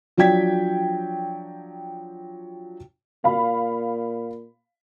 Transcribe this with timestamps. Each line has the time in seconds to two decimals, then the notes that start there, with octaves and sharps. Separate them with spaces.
0.17 F3 F#3 D4 G5 G#6 B6
3.24 A#2 F5 B5